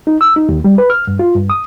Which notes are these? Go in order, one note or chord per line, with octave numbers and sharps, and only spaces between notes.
D#4
E6
D#4
D#2
G3
B4
F6
G2
F4
G2
D#6